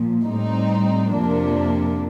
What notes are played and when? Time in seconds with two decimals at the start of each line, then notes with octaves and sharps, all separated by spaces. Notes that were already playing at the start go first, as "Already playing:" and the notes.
Already playing: A#2 F3
0.25 A2 G3 C4 D#4
1.13 F2 C3 F3 A#3 D4